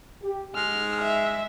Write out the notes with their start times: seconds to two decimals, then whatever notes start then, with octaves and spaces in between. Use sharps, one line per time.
0.22 G4
0.56 G#2 G#3 F6
1.02 E5